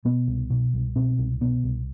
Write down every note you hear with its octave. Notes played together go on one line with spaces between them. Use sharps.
B2 B3
C2
B2
C2
B2 C4
C2
B2 B3
C2